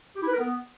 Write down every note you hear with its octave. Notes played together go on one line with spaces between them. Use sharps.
G4
E4
B4
A#4
B3